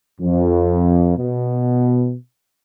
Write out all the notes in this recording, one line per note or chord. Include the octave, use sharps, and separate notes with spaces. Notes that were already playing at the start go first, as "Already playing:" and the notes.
F2
B2